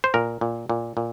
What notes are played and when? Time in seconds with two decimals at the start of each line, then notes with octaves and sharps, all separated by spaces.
0.04 C5
0.14 A#2 A#4
0.41 A#2
0.69 A#2
0.97 A#2